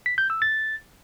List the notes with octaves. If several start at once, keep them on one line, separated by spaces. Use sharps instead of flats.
B6
G6
E6
A6